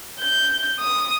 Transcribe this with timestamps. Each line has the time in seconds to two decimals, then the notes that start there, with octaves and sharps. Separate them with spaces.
0.20 G6
0.79 D#6